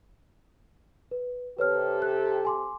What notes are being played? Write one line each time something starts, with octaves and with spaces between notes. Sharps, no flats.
B4
C3 G4 A4 B4 C#5 F6
F#6
G#5 C6 D6